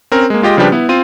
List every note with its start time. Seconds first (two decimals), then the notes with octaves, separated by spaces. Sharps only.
0.12 C4 C#4 A#4
0.30 G#3 A#3
0.42 G#3 F4 G4 D#5 G5
0.57 C#3 F3 G3 D4 G4 B4
0.72 B3 E4
0.89 C4 F4 D#7